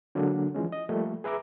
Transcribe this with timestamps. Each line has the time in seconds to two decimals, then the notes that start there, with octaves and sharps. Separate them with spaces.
0.15 D3 F#3 G#3 A#3 D4
0.54 E3 F3 G#3 C#4
0.72 D#5
0.89 F3 G3 A3 A#3
1.24 G#4 B4 E5 A#5 D6